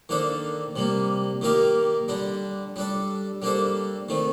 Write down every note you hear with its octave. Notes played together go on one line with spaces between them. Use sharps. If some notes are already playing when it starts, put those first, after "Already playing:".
D#3 A#3 D4 A4 C5
C3 G3 A#3
D#3 A#3 D#4 G4 A#4
D3 G3 D4
G3 D4 A4
G3 A#3 D4 A4 C5
D#3 A3 C4